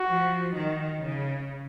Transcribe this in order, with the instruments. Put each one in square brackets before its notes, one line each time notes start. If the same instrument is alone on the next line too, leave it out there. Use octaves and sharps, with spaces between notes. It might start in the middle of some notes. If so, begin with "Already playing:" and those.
Already playing: [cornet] F#4
[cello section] F3
D#3
C#3